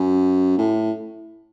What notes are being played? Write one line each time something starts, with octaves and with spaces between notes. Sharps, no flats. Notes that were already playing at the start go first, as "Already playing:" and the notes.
Already playing: F#2
A2